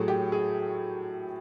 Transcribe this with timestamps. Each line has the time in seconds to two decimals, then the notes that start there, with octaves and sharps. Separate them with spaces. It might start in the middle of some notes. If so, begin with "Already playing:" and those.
Already playing: A2 F#3 A3 G#4
0.08 G4
0.32 G#4